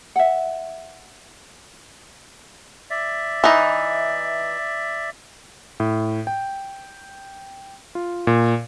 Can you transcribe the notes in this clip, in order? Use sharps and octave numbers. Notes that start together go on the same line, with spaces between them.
E5 F#5
D5 E5
E3 D#4
A2
G5
F4
A#2